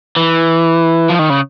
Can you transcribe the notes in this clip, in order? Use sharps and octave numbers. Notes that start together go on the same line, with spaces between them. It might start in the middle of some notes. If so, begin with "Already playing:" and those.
E3
F3
D#3
C#3